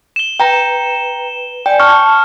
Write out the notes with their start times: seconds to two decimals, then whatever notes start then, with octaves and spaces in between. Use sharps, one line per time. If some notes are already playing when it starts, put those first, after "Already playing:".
0.16 E7 G7
0.40 B4 G5 A#5
1.66 D5 G5 G#5
1.80 A5 C#6 F6